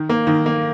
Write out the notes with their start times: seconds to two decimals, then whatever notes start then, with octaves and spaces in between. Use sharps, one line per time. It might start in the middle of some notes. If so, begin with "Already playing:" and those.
Already playing: D#3
0.09 A#3
0.27 D#3
0.46 A#3